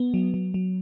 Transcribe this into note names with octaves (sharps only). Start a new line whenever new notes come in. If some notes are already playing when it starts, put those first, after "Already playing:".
Already playing: B3
F#3
F#3
F#3